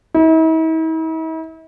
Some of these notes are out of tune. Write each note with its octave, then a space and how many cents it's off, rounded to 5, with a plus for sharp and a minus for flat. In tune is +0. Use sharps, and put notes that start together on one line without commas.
E4 -45